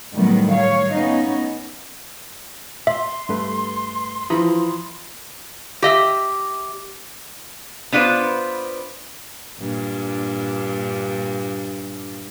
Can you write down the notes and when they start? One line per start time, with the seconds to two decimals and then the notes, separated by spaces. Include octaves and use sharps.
0.14 A2 D#3 F#3 G3 A3 B3
0.50 C#5 F5
0.92 B3 C#4 D#4
2.87 E5 C6
3.29 G2 A3 B4
4.30 E3 F3 A#5 B5 D#6
5.82 G4 D#5 E5
7.92 B3 D4 F4 B4 C5
9.60 G2 A#2 D4